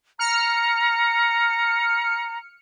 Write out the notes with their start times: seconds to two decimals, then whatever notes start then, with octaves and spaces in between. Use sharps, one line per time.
0.19 A#5 F6 C#7